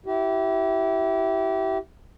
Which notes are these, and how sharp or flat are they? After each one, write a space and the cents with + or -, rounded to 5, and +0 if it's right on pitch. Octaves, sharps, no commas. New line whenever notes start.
E4 +0 G4 -30